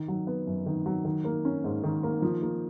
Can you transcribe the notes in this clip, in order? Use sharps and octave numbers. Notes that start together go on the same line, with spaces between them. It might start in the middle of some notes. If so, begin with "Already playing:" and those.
Already playing: D#3
F#3
B3
F#2
D#3
F#3
D#3
A#3
C#4
G#2
D#3
A#3
F3
A#3